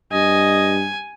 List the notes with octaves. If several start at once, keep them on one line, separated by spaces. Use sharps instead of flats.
G2 D#5 G#5